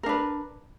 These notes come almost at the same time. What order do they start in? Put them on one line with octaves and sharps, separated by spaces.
A#4 D4 B4